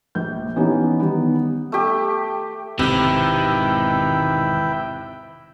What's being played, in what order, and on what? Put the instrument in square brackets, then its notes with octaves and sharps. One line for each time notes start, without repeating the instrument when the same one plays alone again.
[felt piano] A#1 G6
E3 B3 C#4 D#4 G4
D#3 G3 B3
[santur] A3 G4
[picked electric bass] E1 G#2 [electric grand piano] C3 [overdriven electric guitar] D#3 [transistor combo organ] E4 B4 G5